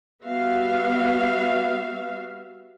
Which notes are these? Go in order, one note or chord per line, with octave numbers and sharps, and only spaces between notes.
G3 B3 F#4 E5 F5